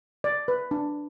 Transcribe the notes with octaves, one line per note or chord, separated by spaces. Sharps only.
D5
B4
D4